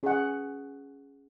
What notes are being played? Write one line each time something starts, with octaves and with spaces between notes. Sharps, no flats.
C#4 G#4 D#5 F#5